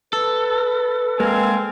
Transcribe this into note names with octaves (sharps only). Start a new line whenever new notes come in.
A4 B4
G#3 A#3 C4 F5 G#5